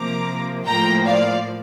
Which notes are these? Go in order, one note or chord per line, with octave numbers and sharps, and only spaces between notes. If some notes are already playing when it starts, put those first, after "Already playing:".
Already playing: C3 F3 A#3 A#5 D6
A2 F3 A#3 G5 A#5
D5 F5